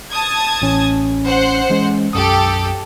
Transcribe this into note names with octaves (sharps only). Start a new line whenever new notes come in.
A5 D#6 G#6
A1 C#4
C5 F#5
E3 G#3 C#4
B1 F#2 G4 A4 D#6